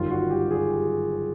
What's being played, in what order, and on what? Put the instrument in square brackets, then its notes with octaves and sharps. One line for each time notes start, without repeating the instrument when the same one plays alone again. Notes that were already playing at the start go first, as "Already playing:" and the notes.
Already playing: [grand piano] G1 F#2 D#3 G3 F4
F#4
G4
G#4
G4
G#4